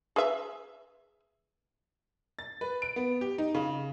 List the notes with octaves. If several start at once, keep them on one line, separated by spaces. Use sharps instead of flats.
G#4 B4 E5
A6
B4
D7
B3
G4
D#4
C#3